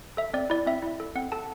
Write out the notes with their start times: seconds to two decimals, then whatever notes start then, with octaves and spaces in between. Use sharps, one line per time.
0.17 A4 E5
0.33 C4 D5
0.50 E4 D5
0.66 C4 E5
0.82 E4
1.00 A4
1.15 C4 F#5
1.32 A4 A5